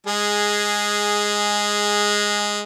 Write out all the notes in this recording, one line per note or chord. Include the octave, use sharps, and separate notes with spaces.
G#3 G#4